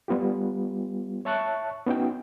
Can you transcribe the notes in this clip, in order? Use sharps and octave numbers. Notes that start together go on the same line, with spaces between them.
G3 B3 F4 G4
C#5 E5 A5 C#6 F#6
B3 C#4 D#4 F#4 G5